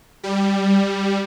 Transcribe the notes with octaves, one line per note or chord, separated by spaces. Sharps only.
G3